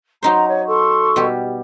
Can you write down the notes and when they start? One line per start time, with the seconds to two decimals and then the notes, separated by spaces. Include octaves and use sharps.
0.23 F#3 D#4 C5 A#5
0.47 C#5
0.66 A4 C6 C#6
1.16 B2 G3 G4